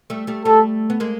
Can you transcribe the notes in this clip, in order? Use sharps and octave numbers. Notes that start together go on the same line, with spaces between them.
G3 A3
G3 A3
G3 A3 A4
B3
G#3 A#3